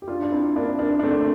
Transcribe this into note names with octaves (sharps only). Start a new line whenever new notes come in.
G4
D4 F4
D4
C4 E4
A#3 D4
A#3 D4
D4
A3 C4